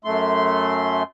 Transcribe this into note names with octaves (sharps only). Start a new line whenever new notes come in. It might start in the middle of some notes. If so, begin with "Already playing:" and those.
F#2 A3 C6